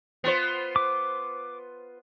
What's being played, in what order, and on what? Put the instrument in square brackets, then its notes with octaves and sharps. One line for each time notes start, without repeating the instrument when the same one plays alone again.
[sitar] B3 F4 C5
[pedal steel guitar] D6